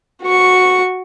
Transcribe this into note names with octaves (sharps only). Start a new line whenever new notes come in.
F#4 C#6